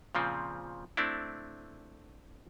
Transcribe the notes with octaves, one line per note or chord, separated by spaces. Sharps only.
A#2 C#3 F3 C4
A3 C4 D4 E4